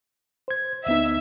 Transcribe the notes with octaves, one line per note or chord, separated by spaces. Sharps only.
C5 G#6
D2 B3 D#4 E5